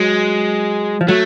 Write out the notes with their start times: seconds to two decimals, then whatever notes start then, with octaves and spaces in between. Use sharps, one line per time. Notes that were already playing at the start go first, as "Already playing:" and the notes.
Already playing: F#3 G#3
1.01 F3
1.08 F#3 A3